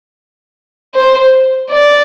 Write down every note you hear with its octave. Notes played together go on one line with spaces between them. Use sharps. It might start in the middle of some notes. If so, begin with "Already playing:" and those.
C5
D5